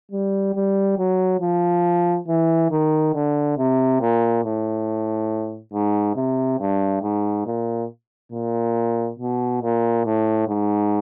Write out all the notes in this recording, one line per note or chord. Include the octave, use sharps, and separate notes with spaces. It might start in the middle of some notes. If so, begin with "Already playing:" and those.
G3
G3
F#3
F3
E3
D#3
D3
C3
A#2
A2
G#2
C3
G2
G#2
A#2
A#2
B2
A#2
A2
G#2